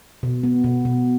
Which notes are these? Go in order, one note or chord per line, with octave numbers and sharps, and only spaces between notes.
B2
B3
B2
B2